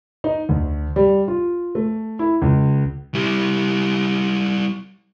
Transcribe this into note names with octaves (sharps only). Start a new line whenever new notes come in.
D#4
D2
G3
F4
A3
E4
C#2
G3 E4